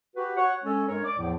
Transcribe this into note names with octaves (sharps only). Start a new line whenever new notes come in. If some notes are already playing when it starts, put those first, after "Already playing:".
F#4 G4 B4
C#5 F#5
G#3 C#4 A4
G2 G#3 A#4 C#5
D5 D6
E2 A2 F3